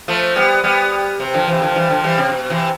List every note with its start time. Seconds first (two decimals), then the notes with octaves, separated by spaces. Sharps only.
0.08 F3 A3
0.36 G3 B3
0.64 G3 B3
1.20 C3
1.34 D3 F3
1.47 C3 E3
1.62 D3 F3
1.76 E3 G3
1.90 D3 F3
2.04 E3 G3
2.18 C3
2.32 B2
2.50 C3 E3